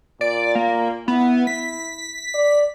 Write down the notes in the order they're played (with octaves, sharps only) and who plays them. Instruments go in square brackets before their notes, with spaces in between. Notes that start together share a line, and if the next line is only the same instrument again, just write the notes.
[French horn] A#2 [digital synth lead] D5
[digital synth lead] A#3
[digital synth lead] B3 [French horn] E4
[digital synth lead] B6
[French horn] D5